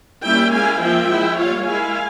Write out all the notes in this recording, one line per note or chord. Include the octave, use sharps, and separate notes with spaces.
G3 A#3 C#4 E4 E5 G5
G#3 E4 F5 G#5
F3 A#3 F4 E5 G5
G#3 E4
G3 A#3 F4 C#5 F5
G#3 E4 F5 G#5